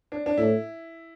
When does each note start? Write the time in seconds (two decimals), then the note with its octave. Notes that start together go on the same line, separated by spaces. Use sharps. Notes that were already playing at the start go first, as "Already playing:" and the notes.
0.12 D4
0.26 D4
0.37 A2 E4